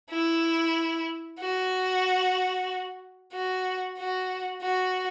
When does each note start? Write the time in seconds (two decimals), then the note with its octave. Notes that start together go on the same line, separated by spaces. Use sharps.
0.11 E4
1.39 F#4
3.33 F#4
3.98 F#4
4.62 F#4